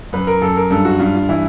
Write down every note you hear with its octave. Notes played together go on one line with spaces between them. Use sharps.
F#2 B4
A#4
F#2 A4
A#4
G2 A4
F#4
G2 F4
F4
E3 E4